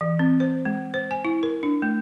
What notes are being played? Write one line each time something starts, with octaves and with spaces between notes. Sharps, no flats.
E3
C4
C5
G#3
C5
G#5
E4
A#4
D4
A3